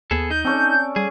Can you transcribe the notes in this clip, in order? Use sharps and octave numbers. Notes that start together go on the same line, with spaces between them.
D#2 B3 G#4 A4
D#4 G6
C4 C#4 A4 D5
G3 G#4